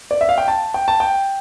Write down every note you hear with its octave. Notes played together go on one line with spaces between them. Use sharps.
D5
E5
F5
G5
A5
G5
A5
G5